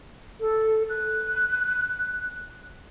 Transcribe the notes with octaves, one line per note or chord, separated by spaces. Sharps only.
A4
F#6